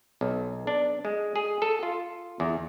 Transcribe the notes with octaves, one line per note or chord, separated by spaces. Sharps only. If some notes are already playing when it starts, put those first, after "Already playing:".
B1
D4
G#3
G#4
A4
F4
E2